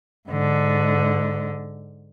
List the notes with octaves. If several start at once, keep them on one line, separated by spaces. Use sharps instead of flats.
G#2 D3